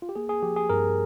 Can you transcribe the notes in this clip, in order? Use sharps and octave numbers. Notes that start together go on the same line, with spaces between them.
F4
G4
A#3 G#4
G#4
F3 G4
G#4
G2 A#4